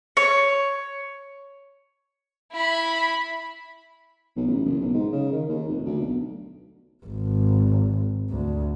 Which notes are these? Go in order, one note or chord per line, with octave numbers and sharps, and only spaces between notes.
C#5
E4 B5
B1
A1
F#1
B1
G#2
C#3
D#3
D#2
F1
D2
B1
G#1
D2